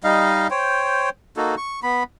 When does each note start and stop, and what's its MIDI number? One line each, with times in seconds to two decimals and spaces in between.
0.04 0.48 55
0.04 0.48 63
0.04 0.48 75
0.04 0.48 77
0.50 1.10 72
0.50 1.10 73
0.50 1.10 79
1.37 1.55 58
1.37 1.55 63
1.37 1.55 66
1.37 1.55 69
1.57 1.80 85
1.83 2.03 59
1.83 2.03 83